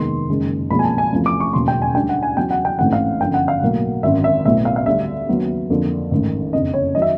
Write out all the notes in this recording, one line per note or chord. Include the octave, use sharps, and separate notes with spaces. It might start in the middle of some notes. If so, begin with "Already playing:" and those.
Already playing: F1 D#2 D#3 G#3 B3 C6
F#1 F#2 D#3 G#3
B1 A#2 F3 G#3 C4 B5
G#5
A5
G#5
E2 C3 F3 A3
D6
C#6
E1 D#2 C#3 F#3 C6
G5
G#5
D2 D3 G3 G5
F#5
G#5
E2 C#3 F#3 G5
F#5
G5
A1 G#2 E3 A3 C4 F#5
F5
G1 F#2 D3 F3 G5
F#5
F5
B1 A2 F#3 A#3
G#1 F#2 D3 E5
E5
B1 A2 F#3 B3 E5
F5
F5
D2 D3 G3 B3 E5
D#2 C#3 F#3 B3
F2 D3 F3 A#3
A1 G#2 D#3
F#1 F2 D3 D#5
C#5
D#3 F#3 D#5
E5